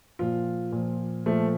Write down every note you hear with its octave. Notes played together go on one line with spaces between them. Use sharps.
A#2 F3 F4
A#2 F3
A#2 F3 A3